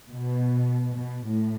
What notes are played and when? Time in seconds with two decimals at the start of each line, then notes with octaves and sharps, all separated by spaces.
0.11 B2
0.96 B2
1.25 A2